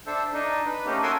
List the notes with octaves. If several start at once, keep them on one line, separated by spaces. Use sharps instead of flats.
D4 A4 C5 E5
D4 D#4
B4
A3 A#3 C#4 D#4 G4
F#4 A4 A#4 E5 G#5 C6